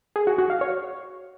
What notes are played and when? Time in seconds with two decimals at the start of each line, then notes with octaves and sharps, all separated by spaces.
0.16 G#4
0.27 F#4
0.38 F#4
0.50 F5
0.61 C#5